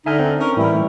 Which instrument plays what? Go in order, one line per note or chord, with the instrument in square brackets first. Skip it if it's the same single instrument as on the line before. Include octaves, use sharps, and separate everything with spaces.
[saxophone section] D3 D#4 [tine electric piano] E5 G#5 F6
[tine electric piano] C4
[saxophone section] C#4 A#4
[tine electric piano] A2 E3 [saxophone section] G3 E4